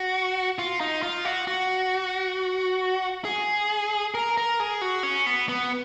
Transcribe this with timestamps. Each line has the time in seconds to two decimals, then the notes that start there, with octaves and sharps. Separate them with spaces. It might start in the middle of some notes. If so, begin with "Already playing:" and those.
Already playing: F#4
0.59 F4
0.81 D#4
1.02 F4
1.25 F#4
1.47 F#4
3.25 G#4
4.14 A#4
4.38 A#4
4.60 G#4
4.81 F#4
5.03 C#4
5.26 B3
5.49 B3